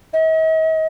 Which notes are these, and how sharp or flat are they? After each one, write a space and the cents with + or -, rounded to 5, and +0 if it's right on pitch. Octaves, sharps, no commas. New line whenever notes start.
D#5 +45